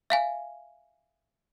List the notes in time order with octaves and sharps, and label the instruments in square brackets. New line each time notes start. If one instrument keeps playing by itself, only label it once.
[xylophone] E5 F5 G#5